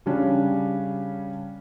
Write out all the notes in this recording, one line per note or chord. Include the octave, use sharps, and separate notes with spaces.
C#3 G3 C#4 D4